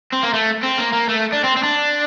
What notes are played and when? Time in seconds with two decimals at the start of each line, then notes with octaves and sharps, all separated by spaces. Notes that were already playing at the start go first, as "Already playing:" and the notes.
0.12 C4
0.23 A#3
0.34 A3
0.63 C4
0.78 A#3
0.93 A#3
1.09 A3
1.33 D4
1.44 C4
1.57 C4
1.63 D4